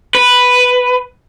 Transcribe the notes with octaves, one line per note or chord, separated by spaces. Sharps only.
B4